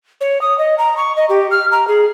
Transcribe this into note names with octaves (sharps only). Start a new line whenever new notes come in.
C#5
D#6
D#5
A#5
C#6
D#5
G4
F6
A#5
G#4